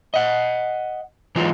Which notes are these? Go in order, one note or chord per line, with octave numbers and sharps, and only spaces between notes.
D#5 F#5
E3 F#3 G#3 D#4 F4